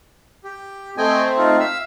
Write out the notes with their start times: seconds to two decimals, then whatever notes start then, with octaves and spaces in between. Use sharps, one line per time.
0.44 G4
0.98 A3 C4 D#5 G5 G#5
1.38 D#4 F4
1.60 E5 F5 E6